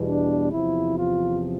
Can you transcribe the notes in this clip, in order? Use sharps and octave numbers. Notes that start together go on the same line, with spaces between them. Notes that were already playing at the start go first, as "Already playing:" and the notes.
Already playing: E2 B2 G3
D4
E2 C3 F3 E4
F4